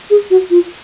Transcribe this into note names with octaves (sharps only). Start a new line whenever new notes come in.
G#4
F#4
F4